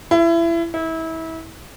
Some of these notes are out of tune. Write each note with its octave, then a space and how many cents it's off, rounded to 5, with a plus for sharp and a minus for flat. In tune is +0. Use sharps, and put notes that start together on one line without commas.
E4 +25
E4 -30